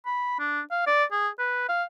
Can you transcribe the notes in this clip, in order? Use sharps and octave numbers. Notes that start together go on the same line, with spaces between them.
B5
D4
F5
D5
G#4
B4
F5